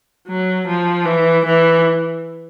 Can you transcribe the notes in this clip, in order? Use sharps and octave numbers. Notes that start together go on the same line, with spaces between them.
F#3
F3
E3
E3